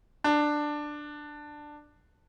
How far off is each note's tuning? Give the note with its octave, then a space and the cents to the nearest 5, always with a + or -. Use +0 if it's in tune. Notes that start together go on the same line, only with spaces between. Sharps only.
D4 +10